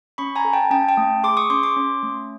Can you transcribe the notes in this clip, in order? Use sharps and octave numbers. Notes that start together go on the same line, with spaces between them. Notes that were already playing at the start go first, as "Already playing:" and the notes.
C#4 B5 C#6
G#5 A#5
A4
G5 A5
C#4 G5 A5
G5 A5
A3
G#4 C6 D6
C#6 D#6
C#4 C6 D6
C6 D6
C#4
A3